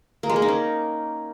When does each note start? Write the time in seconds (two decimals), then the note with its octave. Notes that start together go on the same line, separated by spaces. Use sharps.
0.23 A#3
0.30 G#3
0.36 A#3
0.42 D#4
0.48 C#4